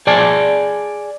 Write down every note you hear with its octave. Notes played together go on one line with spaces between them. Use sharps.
G#4 D5 G#5 A5